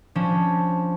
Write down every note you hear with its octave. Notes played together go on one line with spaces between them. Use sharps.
F3 C#4 D4